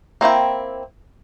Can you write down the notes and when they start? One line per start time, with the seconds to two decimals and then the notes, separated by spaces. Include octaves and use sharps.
0.21 A#3 C4 E4 G5